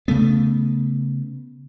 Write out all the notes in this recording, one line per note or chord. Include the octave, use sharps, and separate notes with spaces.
C#3 A3 B3